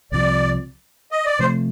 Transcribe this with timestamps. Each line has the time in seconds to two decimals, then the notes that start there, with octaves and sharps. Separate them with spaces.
0.12 C2 C3 F3 D5
1.12 D#5
1.25 D5
1.39 C3 F3 A3 C5